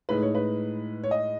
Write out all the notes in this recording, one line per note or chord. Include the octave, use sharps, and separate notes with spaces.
A2 G#3 D#4 B4
C#5
B4
C#5
D#5